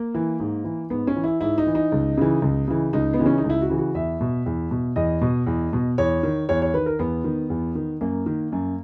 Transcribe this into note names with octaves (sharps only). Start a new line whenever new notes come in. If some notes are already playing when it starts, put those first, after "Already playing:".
Already playing: A#3
E3
G#2
E3
G#2 B3
C#4
E3
E4
G#2 E4
D#4
E3
D#4
C#2
C#3 E3
C#2
C#3 E3
C#2 D#4
B3
C#3 E3
C#4
D#4
C#2
E4
F#4
C#3 E3
F#4
E2 E5
B2
E2
B2
E2 D#5
B2
E2
B2
E2 C#5
D#3
E2 C#5
C#5
D#3 B4
A#4
E2 B3
D#3
E2
D#3
F#2 A#3
D#3
F#2